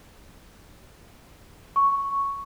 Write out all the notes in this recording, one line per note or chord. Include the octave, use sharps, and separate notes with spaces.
C#6